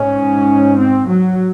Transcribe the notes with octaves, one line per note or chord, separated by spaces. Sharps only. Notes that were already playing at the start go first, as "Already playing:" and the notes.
Already playing: G#2 C#4
C4
F#3